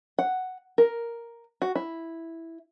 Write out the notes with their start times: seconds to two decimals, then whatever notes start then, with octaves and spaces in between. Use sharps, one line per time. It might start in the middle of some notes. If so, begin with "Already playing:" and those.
0.19 F#5
0.78 A#4
1.62 F#4
1.75 E4